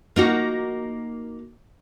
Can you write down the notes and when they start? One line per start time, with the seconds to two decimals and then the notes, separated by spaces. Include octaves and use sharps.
0.16 A#3 D#4 F#4